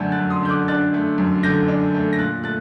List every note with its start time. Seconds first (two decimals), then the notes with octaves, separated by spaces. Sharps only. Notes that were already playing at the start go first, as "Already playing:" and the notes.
Already playing: F#2 D3 A3 D4 F#5 A5 G6
0.12 F#6 A6
0.19 F#2
0.30 C6 D#6
0.43 D3 G6
0.49 D6 F#6
0.68 D4 F#6 A6
0.94 A3
1.18 F#2
1.43 D3 G6 A#6
1.68 D4
1.94 A3
2.13 A#6
2.19 A#2 F#6 A6
2.44 A3 F#6 A6